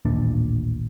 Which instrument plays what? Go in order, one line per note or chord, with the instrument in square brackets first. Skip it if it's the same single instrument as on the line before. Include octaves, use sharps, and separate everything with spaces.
[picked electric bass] A1 D#2 A#2 D4